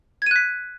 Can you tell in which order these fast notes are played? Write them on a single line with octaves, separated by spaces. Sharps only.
G#6 D#7 F#6 B6